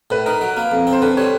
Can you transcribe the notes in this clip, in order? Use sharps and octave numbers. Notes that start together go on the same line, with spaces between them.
A2 B4
D#4 A#4
F#3
A#3
F2
C4
C5
D3 B4
G3 C#5